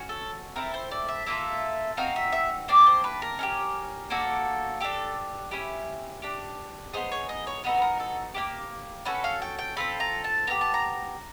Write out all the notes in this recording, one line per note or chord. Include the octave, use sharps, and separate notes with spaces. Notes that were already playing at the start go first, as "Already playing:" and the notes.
Already playing: C#4 F#4
A4
C4 E4 A4 A#4
C5
D5
E5
A#3 D4 F4 A4 E5
C4 D#4 F#4 F5
E5
E5
A#3 D4 G4 D5
C5
B4
A#4
C#4 E4 G4
A#3 D4 F#4 A4
D4 G4 A4
C#4 E4 G4
D4 G4
B3 D#4 G#4 C5
C#5
D#5
C#5
B3 D#4 F#4 A4 B4
B4
A#4
A4
A#3 D4 G4
C#4 F#4 A4 B4
F5
G5
G5
C4 F4 A4 B5
A#5
A5
B3 E4 G4 A#5
A5
A#5